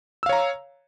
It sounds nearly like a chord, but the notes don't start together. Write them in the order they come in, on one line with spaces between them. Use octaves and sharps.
E6 F5 C#5 A#5